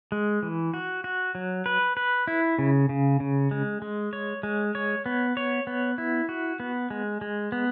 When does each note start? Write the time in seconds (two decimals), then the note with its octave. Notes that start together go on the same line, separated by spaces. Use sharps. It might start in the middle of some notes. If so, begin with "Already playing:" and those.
0.12 G#3
0.43 E3
0.74 F#4
1.04 F#4
1.35 F#3
1.66 B4
1.97 B4
2.27 E4
2.59 C#3
2.89 C#3
3.20 C#3
3.51 G#3
3.82 G#3
4.13 C#5
4.43 G#3
4.75 C#5
5.06 B3
5.37 C#5
5.67 B3
5.98 E4
6.29 F#4
6.60 B3
6.90 G#3
7.21 G#3
7.52 B3